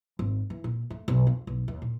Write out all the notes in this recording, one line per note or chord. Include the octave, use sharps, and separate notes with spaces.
G#1
E3
A#2
A3
B1
F2
B1
D#2
A#2